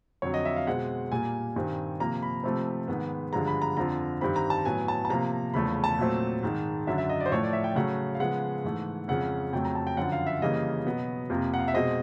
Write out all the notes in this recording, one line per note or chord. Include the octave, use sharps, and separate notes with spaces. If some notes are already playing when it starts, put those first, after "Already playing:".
F2 D3 F#3 C#5
D#5
E5
F5
B2 G#3 C4 F#5
A#2 G3 A#3 G#5
G2 D#3 G3 C4
C3 F3 A#3 A#5
B5
C3 F3 A3 C4
G#2 D#3 G#3 B3
G2 D3 F3 G#3 A#5
B5
A#5
F2 D3 F3 A#5
G2 D#3 G3 C4 B5
A#5
A5
A2 F#3 B3 G#5
A5
A5
C3 F3 A#3 A#5
E2 C#3 F3 A3 B5
A5
A#2 F#3 A3 C4
G#2 D#3 G#3
F#2 D3 F#3 E5
E5
D#5
D5
C5
A2 F3 A3 C#5
D5
E5
G5
C#3 F#3 A3 F#5
F5
C#3 F3 G#3 B3 F#5
G#2 E3 A3
F2 C#3 F3 G#3 F#5
F2 C#3 F#3 A3 G5
A#5
A5
G5
F#2 D3 F3 F#5
F5
E5
C#3 E3 G3 A#3 D#5
B2 F#3 B3
F2 C3 F3 A#3
F#5
F5
E5
B2 G#3 C4 D#5